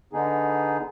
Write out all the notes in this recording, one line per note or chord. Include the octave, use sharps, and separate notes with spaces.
D3 B3 D#4 G#4